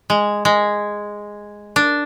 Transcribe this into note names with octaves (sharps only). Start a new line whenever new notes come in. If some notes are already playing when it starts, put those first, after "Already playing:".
G#3
G#3
D4